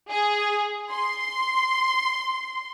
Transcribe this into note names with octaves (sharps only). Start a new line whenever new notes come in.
G#4
C6